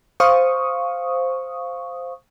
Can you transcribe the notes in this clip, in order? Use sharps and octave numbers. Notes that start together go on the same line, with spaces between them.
C5 F5 C#6 D#6